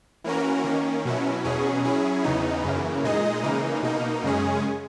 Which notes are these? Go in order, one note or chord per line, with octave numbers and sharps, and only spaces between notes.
E3 A#3 C#4 F#4 A#4
D#3 A#3 C#4
B2 F#3 C#4 E4
E2 B2 F#3 C#4 G#4
F#3 C#4 E4 G#4
E2 C#3 E3 B3 D#4
F#2 C#3 E3 A#3
A#2 G#3 D#4 G#4 D#5
C#3 E3 A#3 D#4
B2 A#3 D#4
F#2 C#3 G#3 C#4 G#4